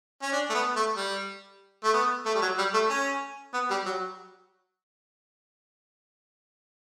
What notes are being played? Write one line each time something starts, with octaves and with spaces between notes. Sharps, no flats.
C#4
D4
A3
B3
A3
G3
A3
B3
A3
G3
F#3
G3
A3
C#4
B3
G3
F#3